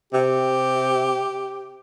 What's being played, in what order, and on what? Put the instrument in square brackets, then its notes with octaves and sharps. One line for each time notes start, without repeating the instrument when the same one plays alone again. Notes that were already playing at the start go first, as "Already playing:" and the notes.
[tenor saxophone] C3 [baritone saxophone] G4